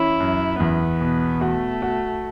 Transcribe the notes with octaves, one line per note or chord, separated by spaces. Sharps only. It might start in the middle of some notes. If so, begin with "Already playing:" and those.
Already playing: E3 C#4 E4
F#2
E2 B3
B2
A3 F#4
F#4